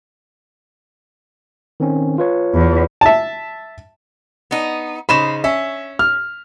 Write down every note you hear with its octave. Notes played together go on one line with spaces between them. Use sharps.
D#3 C4 C#4
F4 B4 C#5
E2
E5 A5
B3 D#4
C#3 D#4 C5 B5 E7
C#4 E5
F6